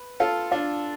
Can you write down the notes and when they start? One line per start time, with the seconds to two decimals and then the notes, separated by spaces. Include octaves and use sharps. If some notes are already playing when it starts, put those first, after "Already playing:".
Already playing: B4
0.20 F4 A4
0.52 D4 F4